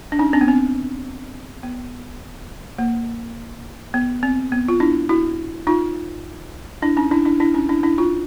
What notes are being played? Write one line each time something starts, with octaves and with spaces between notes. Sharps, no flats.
D4
C#4 D#4
C4 D4
B3
C4
B3
A#3
B3
C4
B3
F4
D4 E4
E4 F#4
D#4 F4
D4 E4
C#4 D#4
D4 E4
D4 E4
D4 E4
C#4 D#4
D4 E4
D4 E4
D#4 F4